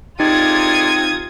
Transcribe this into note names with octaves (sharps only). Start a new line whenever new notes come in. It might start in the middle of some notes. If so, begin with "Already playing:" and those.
C3 D#4 F4 G#4 A4 D5 D#6 G#6